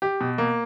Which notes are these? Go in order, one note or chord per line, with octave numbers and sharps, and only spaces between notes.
G4
B2
A#3